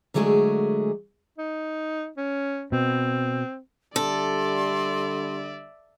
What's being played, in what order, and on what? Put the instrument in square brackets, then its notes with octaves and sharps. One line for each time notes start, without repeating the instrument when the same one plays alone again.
[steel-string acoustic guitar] D3 F#3 G#3 A3 G#4
[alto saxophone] D#4
C#4
[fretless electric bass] B2 [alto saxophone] C4
[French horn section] D3 G3 [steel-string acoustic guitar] A4 [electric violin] D5 E5 [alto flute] C6